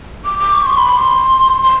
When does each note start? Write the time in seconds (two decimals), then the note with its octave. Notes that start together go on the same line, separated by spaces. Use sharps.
0.25 D6
0.39 D6
0.54 C#6
0.66 C6
0.78 B5
0.89 C6
1.63 C6